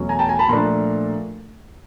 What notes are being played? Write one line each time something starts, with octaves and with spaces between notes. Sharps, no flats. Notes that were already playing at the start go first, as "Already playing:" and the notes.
Already playing: E2 B2 F#3 A3 C#4
G#5 A#5
G5 A5
G#5 A#5
A5 B5
A#2 F3 A3 D4 A#5 C6